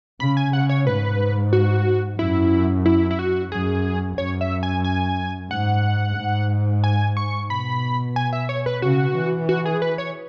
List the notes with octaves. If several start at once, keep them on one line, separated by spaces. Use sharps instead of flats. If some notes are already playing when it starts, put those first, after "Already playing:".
C#3 B5
G#5
C#3 F#5
C#5
G#2 B4
F#4
F#2 E4
E4
E4
F#4
F#2 G#4
F#2 C#5
E5
G#5
G#5
G#2 F#5
G#2
G#5
C#6
B2 B5
G#5
E5
C#5
B4
C#3 F#4
E3
F#4
G#4
B4
C#5